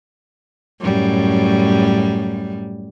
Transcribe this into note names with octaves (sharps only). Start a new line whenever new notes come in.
F#2 A2 G3